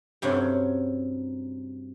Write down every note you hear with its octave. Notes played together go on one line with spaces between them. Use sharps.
G2 C3 F#3 C#4